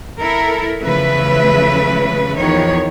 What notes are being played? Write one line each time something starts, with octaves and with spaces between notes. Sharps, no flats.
E4 A4 A#4
E2 C#3 F3 A3 B4 E5
E2 D#3 F3 C#5